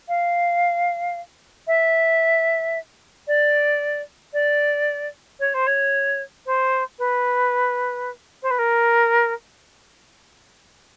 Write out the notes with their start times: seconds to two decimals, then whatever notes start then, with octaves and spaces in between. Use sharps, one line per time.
0.08 F5
1.67 E5
3.27 D5
4.33 D5
5.39 C#5
5.54 C5
5.66 C#5
6.46 C5
6.98 B4
8.42 C5
8.50 B4
8.58 A#4